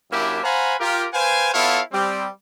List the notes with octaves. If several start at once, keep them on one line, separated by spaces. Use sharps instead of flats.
F#2 A#3 D4 E4 G4 E5
C5 F5 F#5 G#5 A#5 B5
F4 G4 A#4
B4 C5 F5 G5 G#5
B3 E4 F4 A4 C#5 F5
G3 C4